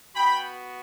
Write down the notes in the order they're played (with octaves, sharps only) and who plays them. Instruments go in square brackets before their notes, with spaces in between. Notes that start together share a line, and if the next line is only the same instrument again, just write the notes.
[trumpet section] B3 F#4 G5 B5